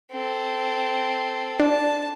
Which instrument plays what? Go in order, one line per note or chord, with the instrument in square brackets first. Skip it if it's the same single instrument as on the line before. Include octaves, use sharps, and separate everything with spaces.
[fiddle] C4 A4
[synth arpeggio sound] D4 [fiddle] A5